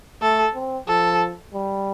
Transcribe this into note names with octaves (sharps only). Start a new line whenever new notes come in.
A3 A4
C4
F3 A4
G3